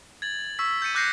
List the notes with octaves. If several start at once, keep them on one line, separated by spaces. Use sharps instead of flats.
G#6 A6 F#7
G#6
C#6 E6 B6
G6 A6 C#7 D#7
D6 F#6 G6 A#6 C7 C#7